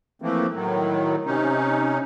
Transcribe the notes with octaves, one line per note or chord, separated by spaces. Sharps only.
E3 F3 A3 A#3 C4
A2 D#3 F#3
C3 C#4 D#4